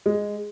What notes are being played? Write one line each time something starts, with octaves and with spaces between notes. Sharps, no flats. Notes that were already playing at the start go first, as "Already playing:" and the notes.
G#3